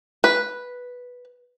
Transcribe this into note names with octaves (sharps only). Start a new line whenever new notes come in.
B4